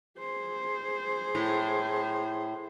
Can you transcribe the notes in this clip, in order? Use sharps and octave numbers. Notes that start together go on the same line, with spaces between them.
G#4 C5
A2